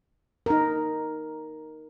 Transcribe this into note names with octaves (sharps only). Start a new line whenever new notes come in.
D#4 A#4